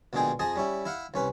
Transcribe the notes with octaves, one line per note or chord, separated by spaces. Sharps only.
A#1 B2 D3 G#3 G#4 G5
F2 G#4 D#5 A5
G3 C#4 E4
E4 F5 F#5
C2 C#4 B4